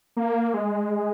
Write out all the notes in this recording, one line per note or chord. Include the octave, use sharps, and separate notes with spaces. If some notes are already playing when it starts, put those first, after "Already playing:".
A#3
G#3